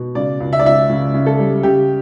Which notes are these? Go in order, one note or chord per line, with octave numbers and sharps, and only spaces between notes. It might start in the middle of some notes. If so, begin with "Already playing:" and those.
Already playing: B2
C#3 D5
C#2
E5
D5
C#2 E5
C#3
C#3
A4
G3
C#3 G4